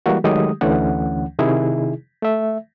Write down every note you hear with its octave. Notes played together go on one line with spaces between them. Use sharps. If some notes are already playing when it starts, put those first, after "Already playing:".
E3 G3 G#3 A#3 F#4
D#3 F#3 G#3 A3 G4 D#6
D2 D3 E3 A3 C#4 F#5
C3 D#3 D#4 E4 G#4
A3 E5